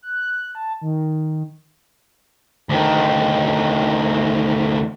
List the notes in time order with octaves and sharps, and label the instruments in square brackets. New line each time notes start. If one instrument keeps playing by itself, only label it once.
[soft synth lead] F#6
A5
D#3
[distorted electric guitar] D2 D#3